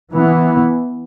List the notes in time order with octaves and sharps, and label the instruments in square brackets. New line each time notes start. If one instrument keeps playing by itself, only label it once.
[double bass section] E3 B3